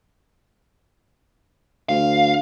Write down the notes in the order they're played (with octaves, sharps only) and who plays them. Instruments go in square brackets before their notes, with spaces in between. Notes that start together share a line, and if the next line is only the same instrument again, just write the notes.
[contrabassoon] D2 [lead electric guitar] F5